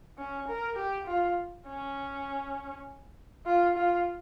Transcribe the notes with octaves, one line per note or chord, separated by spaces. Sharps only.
C#4
A#4
G4
F4
C#4
F4
F4